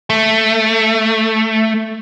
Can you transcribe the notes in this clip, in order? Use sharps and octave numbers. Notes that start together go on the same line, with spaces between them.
A3